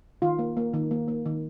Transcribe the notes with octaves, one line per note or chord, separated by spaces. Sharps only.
D#3 F4
A#3
A#3
D#3
A#3
A#3
D#3